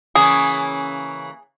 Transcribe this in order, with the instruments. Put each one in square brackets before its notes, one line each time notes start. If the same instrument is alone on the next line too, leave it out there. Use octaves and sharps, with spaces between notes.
[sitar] C#3 E3 A#3 [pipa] G#4